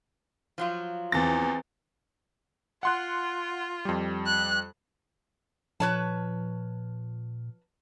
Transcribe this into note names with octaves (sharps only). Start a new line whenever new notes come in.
F3 F#3 F4
E2 E3 C4 A6
F4 F#5 C6 F#6
F2 G3
F#6
A#2 F3 B4 C#5 A5